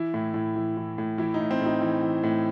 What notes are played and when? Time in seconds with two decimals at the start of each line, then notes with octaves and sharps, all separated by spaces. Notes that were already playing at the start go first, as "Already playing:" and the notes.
Already playing: E3 E4
0.14 A2
0.34 A2
0.56 E3
0.77 E3
0.98 A2
1.18 E3 E4
1.34 D#4
1.40 A2
1.51 C4
1.61 A2
1.66 D#4
1.82 E3
2.03 E3
2.23 A2